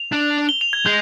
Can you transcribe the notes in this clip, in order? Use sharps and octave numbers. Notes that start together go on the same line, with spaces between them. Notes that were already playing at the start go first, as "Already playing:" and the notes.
Already playing: F7
D4
G7
F7
G#6
G#3 G6